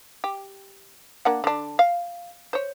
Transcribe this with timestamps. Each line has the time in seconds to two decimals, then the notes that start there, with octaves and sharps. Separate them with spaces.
0.24 G4
1.25 A#3 D4 F#5
1.44 D3 D4
1.79 F5
2.53 C5 C#5